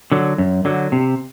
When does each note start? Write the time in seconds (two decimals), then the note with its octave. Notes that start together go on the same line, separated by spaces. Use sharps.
0.12 D3 F#3
0.38 F#2
0.65 D3 F#3
0.92 C3